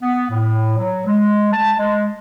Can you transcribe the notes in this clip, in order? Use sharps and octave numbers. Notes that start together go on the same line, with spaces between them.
B3
A2
F#3
G#3
A5
G#3